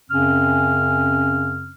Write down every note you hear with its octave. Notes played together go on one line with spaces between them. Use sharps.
F#2 C#3 C4 C#4 F6